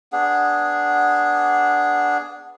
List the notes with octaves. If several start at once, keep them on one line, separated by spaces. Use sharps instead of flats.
B3 D4 G#4